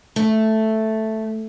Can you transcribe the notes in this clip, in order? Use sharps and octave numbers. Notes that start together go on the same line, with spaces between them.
A3